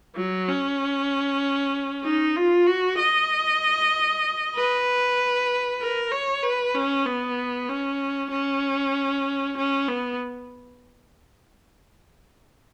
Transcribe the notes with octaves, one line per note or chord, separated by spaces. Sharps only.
F#3
C#4
D#4
F4
F#4
D#5
B4
A#4
C#5
B4
C#4
B3
C#4
C#4
C#4
B3